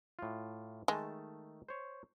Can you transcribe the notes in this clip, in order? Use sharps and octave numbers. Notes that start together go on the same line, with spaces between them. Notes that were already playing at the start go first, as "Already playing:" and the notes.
A2 F4
D#3 G#3 A3 A5
C5 C#5